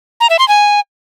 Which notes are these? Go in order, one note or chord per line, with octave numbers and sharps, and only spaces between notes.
A#5
E5
C6
G#5